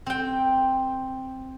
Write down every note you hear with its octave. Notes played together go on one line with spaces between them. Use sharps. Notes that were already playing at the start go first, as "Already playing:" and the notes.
C4 G5